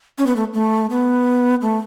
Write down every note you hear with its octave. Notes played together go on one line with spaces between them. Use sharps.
C#4
B3
A3
A3
B3
A3